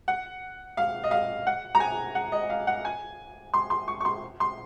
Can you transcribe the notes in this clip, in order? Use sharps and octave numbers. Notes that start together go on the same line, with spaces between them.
F#5
F5
D#5
F5
F#5
A#5
G#5
F#5
D#5
F5
F#5
G#5
C6
C6
C#6
C#6
C6
C6